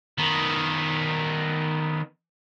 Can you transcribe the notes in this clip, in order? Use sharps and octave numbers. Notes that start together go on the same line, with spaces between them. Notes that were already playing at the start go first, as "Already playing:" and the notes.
D#3 B3